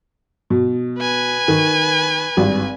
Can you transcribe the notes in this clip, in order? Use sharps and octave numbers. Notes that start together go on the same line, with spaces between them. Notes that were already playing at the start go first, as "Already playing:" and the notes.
B2
B4 G#5
D#3
G#1 G2